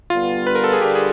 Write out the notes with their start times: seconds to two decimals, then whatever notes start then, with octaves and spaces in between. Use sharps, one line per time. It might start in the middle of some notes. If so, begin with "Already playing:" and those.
0.10 G2 D3 G3 B3 F4
0.47 B4
0.55 A#4
0.64 A4
0.73 G#4
0.81 D3 G3 G4
0.95 G#4